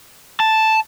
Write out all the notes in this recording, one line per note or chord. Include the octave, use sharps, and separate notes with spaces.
A5